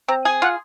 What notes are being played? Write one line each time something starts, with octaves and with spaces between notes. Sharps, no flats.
C4 A#5
G#4 G#5
F4 F#5